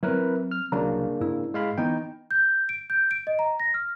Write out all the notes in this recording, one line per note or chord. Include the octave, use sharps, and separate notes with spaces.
F#3 C4 E4 A#4 B4
F6
C2 C#3 F#3 A#3 D4 A#5
G#2 E4
G#3 F5 B5
E3 B3 D#4 G5
G6
D7
G6
D7
D#5
A#5
A#6
F6